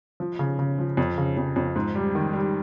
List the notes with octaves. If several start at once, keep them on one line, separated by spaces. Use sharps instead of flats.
F3
C#3
C#3
F3
F2
C#3
F2
F2
G#2
G3
D#3
G3